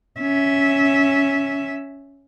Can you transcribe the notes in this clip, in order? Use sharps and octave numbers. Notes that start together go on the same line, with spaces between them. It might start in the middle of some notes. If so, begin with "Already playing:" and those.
C#4 E5